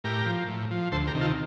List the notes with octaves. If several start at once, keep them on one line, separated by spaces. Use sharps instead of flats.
A2 G4 A#4
F3
A2
F3
D2 A4 C5
G4 A#4
C3 D#3
F4 A4